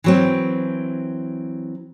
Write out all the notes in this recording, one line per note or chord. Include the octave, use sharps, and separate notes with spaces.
E3 F#3 C4